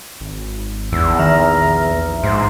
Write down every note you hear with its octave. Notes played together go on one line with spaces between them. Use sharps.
G#1
A#1 E2 E6
D#3 E5 A#5 F6
G#2 C5